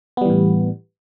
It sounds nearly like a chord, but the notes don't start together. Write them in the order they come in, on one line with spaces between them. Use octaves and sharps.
B3 G3 E3 A2